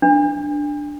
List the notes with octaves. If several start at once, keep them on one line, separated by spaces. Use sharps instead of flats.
D4